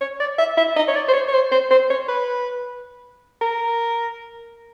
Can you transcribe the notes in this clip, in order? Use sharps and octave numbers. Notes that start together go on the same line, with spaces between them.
C#5
D5
E5
E5
D#5
C#5
D5
C5
C#5
C#5
C5
C5
C5
C#5
B4
A#4